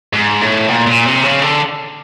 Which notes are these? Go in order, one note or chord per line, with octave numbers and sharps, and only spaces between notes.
G#2
A2
A#2
A#2
C3
C#3
D3